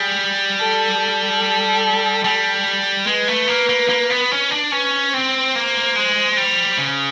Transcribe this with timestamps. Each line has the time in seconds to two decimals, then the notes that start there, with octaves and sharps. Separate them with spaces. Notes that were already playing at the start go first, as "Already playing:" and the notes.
Already playing: G3 G#4
0.60 A4
1.00 A4
2.24 G3
3.07 G#3 B4
3.28 A3
3.48 A#3
3.69 A#3
3.89 A#3
4.10 B3
4.31 C#4
4.51 D4
4.72 C#4 B4
5.13 C4 C5
5.55 A#3
5.96 G#3
6.37 G3
6.78 C#3